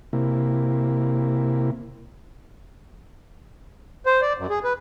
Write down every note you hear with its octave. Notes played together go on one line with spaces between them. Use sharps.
C3 A#3 E4
C5
D5
F#2
G#4
B4